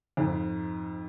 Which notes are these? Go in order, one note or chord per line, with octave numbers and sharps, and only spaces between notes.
F2 G#2